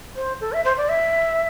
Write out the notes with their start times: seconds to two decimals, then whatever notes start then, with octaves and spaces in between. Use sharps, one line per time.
0.16 C5
0.41 A4
0.53 E5
0.65 C5
0.77 D5
0.89 E5